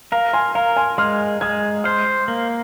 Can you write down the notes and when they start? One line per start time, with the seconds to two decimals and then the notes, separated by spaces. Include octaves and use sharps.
0.12 A#4 F5 A#5
0.33 G#5 C6
0.55 A#4 F5 A#5
0.76 G#5 C6
0.98 G#3 C6 F6
1.41 G#3 D#6 G#6
1.84 C5 C6 F6
2.28 A#3